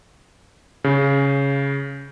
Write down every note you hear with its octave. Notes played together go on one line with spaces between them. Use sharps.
C#3